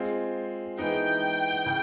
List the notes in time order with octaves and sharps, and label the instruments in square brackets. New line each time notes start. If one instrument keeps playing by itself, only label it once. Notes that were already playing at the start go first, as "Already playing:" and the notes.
Already playing: [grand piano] G#3 C4 F4
[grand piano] E3 G#3 B3 D#4 [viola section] G5
[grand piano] C#3 E3